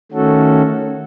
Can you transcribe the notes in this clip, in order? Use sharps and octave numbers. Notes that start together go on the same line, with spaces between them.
D#3 A3 C#4 F#4 A4